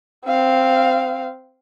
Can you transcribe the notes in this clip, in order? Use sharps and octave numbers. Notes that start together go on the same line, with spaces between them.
C4 F5